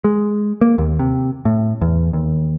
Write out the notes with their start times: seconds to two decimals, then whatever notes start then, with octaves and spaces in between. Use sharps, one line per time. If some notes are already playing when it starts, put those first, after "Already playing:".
0.04 G#3
0.61 A#3
0.78 D#2
0.99 C3
1.45 A2
1.81 E2
2.13 D#2